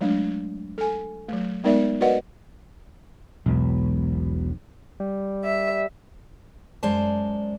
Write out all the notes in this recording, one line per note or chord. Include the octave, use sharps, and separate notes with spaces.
F#3 G#3 A3 D4
A4 G#5
F#3 A3
G#3 B3 D#4 A#4 D5 E5
F#4 A#4 B4 D5 D#5 F#5
E1 B1
G3
E5
F#2 G#3 C5 D5 A5